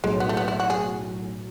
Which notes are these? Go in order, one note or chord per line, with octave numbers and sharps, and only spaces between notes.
B1 A2 F#3 G#3
B3
A3
B3
E4
F#4
G#4